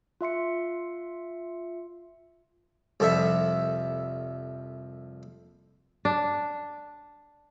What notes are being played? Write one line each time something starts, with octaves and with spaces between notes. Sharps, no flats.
F4 E5 C6 C#7
C2 F2 A4 E5
D4